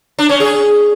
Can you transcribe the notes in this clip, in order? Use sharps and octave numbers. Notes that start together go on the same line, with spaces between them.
D4
C#4
G#4